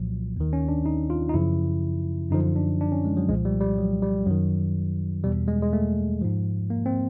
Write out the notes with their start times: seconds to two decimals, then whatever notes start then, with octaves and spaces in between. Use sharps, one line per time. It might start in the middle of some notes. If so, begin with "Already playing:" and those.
Already playing: C2 A#2 F3 F#3
0.36 D#2 D#3
0.53 C#4
0.68 D4
0.86 D#4
1.10 F4
1.29 D#4
1.34 F#2 C#3 F3 E4
2.31 F#2 D3 F3 D#4
2.56 D4
2.81 D4
2.92 C#4
3.05 G#3
3.17 F#3
3.29 C2 A#2 F3 G#3
3.45 G3
3.61 G3
3.78 F#3
4.03 G3
4.26 F#2 D#3 F#3
5.24 E2 B2 G3
5.48 G#3
5.62 G#3
5.73 A3
6.22 G#2 F3
6.70 A#3
6.86 C4